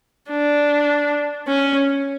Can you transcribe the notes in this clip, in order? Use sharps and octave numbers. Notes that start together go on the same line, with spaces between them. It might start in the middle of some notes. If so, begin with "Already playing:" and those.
D4
C#4